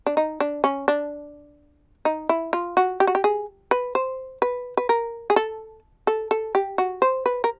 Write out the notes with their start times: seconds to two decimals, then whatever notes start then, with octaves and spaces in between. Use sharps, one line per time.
0.06 D4
0.17 D#4
0.40 D4
0.64 C#4
0.88 D4
2.05 D#4
2.29 E4
2.53 F4
2.77 F#4
3.00 G4
3.07 F#4
3.15 G4
3.24 G#4
3.71 B4
3.95 C5
4.42 B4
4.77 B4
4.89 A#4
5.30 G#4
5.36 A4
6.07 A4
6.31 A4
6.55 G4
6.78 F#4
7.02 C5
7.26 B4
7.44 A#4